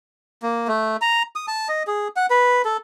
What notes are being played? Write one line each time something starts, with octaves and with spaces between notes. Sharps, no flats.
A#3
A3
A#5
D#6
A5
D#5
G#4
F#5
B4
A4